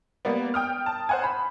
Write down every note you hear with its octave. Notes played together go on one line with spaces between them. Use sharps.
G3 A#3 B3
G5 D#6 F6
A5
C5 F#5 G#5
B5